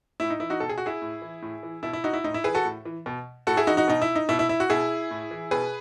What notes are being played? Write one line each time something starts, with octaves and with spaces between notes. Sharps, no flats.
A2 E4
D#4
E3 E4
D#4 F#4
B2 A4
G#4
F#4
E4 G#4
A2
E3
A2
E3
B2 E4
E4
D#4 F#4
E4
A2 D#4
E4
E3 G#4 B4
F#4 A4
A2
E3
B2
A2 F#4 A4
E4 G#4
E3 D#4 F#4
D#4 F#4
B2 D#4
E4
D#4
B2 E4
E4
E4
F#4
B2 E4 G#4
A2
E3
B2 G#4 B4